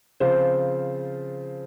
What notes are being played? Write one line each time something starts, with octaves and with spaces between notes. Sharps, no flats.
C#3 F3 C4 F4 C5